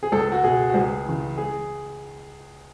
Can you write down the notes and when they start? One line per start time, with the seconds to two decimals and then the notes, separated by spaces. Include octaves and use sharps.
0.03 G#4
0.12 C#2 A4
0.32 F#4
0.43 B2 G#4
0.70 F#4
0.74 C#2 G#4
1.05 C#3 E3
1.37 G#4